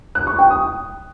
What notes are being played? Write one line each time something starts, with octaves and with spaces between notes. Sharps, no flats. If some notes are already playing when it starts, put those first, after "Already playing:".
F#6
C#6
G5
D#6